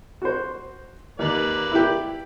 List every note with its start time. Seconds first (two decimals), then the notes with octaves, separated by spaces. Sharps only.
0.22 F#4 C5
1.19 D#2 A#3 B4 D5
1.71 E4 G4